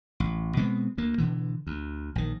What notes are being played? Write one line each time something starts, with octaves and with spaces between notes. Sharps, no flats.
A1
B2 G#3 B3 C4
D2 A#3
B2 D3 E3
D2
A#1 D#3